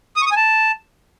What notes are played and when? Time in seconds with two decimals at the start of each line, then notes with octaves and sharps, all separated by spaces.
0.16 D#6
0.21 C#6
0.26 D#6
0.31 G#5
0.36 A5